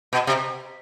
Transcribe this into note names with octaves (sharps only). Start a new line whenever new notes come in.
B2
C3